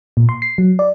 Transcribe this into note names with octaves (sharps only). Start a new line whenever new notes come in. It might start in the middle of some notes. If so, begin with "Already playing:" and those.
A#2
C6
C7
F#3
D5